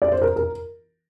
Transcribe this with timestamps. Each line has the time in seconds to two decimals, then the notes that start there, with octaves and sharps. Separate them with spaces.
0.02 D5
0.12 C5
0.22 A#4
0.36 A#4